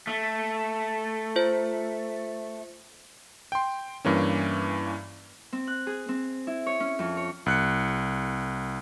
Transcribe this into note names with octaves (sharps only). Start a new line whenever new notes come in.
A3
F4 C5
G5 C6
G2 E3 A#3 C#4
C4
F#6
G#4
C4
E4
C#5
C#4
F2
C#5
C2 F#6 C#7